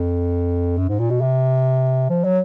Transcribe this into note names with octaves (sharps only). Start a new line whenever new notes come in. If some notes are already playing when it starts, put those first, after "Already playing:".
Already playing: F2
F#2
G#2
A#2
B2
C3
F3
F#3